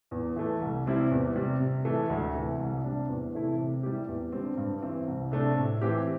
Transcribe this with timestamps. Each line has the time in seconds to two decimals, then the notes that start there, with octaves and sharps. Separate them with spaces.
0.11 E2
0.36 E3 A3
0.61 C2
0.86 C3 G3 C4 E4
1.11 E2
1.35 C3 G3
1.60 C3
1.85 E3 A3
2.10 D2
2.34 C3 E3 A3
2.59 C2
2.84 C3 G3 D4
3.09 E2
3.34 C3 E3 A3 E4
3.58 C3
3.83 G3 E4 G4
4.08 E2
4.32 D3 G3 C4
4.57 G2
4.82 E3 C4
5.07 C2
5.31 C3 A3 D4
5.56 A2
5.81 E3 C4 G4